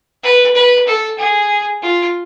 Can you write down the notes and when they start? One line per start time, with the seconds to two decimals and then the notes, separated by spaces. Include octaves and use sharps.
0.23 B4
0.55 B4
0.87 A4
1.19 G#4
1.82 F4